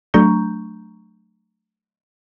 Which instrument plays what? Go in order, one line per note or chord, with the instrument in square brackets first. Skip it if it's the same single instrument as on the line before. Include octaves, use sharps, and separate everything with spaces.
[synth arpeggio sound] F#3 A3 D4 A#5 C#6 G6